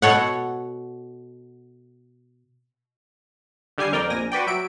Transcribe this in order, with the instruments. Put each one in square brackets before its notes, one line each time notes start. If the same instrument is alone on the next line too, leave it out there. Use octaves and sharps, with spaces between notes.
[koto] B2 A4 C#5 F#5
[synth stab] D3 G3 G#5 C7
F2 A#4 D5 G5
A#1 G#5 A#6
F#4 B4 D5 G5
F#3 E5 D7